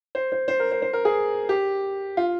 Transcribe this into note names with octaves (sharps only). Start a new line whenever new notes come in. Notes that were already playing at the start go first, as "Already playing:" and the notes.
C5
C5
C5
A#4
C5
C5
A#4
G#4
G4
F4